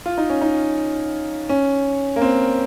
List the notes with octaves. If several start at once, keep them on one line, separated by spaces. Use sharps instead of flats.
F4
D#4
C#4
D#4
C#4
A#3
C4